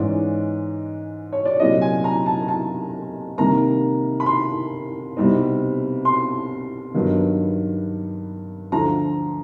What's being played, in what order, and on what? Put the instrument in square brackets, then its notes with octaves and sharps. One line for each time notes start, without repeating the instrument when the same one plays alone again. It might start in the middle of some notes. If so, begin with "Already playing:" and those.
Already playing: [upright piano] G#2 E3 G#3 C#4 D5
C#5
D5
C2 A#2 F#3 D#5
G#5
A#5
A5
A5
C3 D#3 G3 A#3 A#5
B5
C6
C2 B2 G3 C4 D#4
C6
G2 D#3 F#3 B3 D#4
D2 D3 F3 A#5